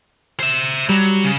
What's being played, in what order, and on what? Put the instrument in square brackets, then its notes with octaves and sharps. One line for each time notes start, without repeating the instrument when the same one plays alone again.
[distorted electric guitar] C5 E5
[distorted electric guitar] F#3 [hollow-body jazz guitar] G3
[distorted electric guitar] C#3